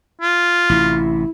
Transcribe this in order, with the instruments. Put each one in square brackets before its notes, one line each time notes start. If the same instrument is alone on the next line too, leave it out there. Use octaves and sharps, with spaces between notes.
[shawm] F4
[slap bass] A1 C3 [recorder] E4